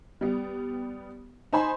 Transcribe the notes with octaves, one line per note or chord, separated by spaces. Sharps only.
G3 B3
D#4 C5 G#5 B5 C6